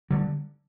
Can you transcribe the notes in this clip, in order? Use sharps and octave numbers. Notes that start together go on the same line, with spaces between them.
D3 G3